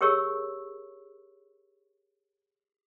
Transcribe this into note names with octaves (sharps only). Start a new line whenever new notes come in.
G4 G#4 A#4 C#5 C#6 E6